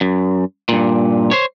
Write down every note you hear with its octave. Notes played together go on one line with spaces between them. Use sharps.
F#2
G2 A#2
C5 C#5